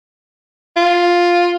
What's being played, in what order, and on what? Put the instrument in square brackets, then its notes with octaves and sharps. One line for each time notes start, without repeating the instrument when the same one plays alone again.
[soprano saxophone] F4